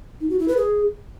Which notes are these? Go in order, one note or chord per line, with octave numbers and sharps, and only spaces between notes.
D#4
F#4
E4
B4
G#4